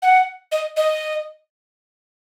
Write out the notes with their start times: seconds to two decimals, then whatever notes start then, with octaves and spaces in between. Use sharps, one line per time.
0.02 F#5
0.52 D#5
0.77 D#5